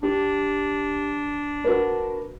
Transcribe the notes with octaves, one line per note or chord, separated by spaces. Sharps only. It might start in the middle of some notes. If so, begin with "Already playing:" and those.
D4 G4
F#4 A#4 B4